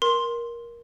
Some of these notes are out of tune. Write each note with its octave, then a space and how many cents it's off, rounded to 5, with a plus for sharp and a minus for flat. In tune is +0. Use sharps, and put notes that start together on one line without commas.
A#4 +15 C6 +5